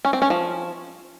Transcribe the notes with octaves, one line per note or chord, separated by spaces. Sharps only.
C#4
C4
C#4
F3